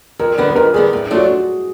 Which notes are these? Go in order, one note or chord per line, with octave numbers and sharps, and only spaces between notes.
F2 A#4
D3 G3 B3 B4
B4
F2 A#4
D3 G3 B3 G#4
A2
F#3 A3 D4 F4
F#4